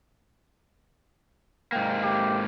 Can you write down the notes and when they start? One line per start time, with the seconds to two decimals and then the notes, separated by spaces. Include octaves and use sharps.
1.72 G#2 A#3 G5
2.03 G4